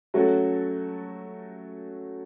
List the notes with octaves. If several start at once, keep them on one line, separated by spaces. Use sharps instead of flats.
F#3 A3 C#4 F#4 A4